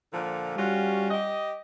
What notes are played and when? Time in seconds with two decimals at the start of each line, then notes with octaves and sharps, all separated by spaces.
0.12 A#2 D3 F3
0.57 G3 C#4 F4 F#4
1.11 G4 D#5